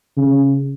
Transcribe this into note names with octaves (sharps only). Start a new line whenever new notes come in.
C#3